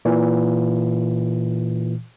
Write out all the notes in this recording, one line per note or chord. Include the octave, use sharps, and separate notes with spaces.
A#2 E3